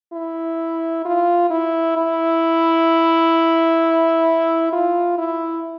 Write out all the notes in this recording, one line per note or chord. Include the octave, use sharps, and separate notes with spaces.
E4
F4
E4
E4
F4
E4